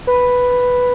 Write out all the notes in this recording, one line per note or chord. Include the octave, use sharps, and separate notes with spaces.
B4